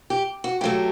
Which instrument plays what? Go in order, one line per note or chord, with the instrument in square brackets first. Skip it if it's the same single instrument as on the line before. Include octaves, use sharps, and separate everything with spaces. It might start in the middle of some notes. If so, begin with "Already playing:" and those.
[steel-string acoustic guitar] G4
F#4
A2 F#3 A3 G4